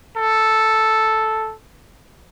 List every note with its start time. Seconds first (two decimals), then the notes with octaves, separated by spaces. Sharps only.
0.17 A4